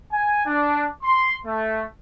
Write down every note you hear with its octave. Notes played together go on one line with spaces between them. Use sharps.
G#5
D4
C6
A3